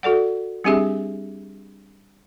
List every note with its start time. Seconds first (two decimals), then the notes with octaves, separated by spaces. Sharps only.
0.03 F#4 A4 D5 F#5
0.64 G3 C4 D4 G4 G#4 E5